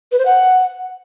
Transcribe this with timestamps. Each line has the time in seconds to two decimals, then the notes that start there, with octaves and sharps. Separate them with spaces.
0.12 B4
0.19 C5
0.26 F#5